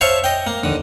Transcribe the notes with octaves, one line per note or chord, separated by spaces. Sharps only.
C5 C#5 E5 F5 A5 C#6
D#5 G5
A#3
D#2 D3